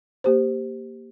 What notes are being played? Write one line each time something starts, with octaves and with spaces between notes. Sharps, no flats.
A#3 G4 C5